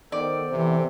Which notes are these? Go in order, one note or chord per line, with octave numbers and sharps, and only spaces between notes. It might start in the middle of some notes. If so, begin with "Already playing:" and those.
D#3 B3 A4 C5 D5
C3 E3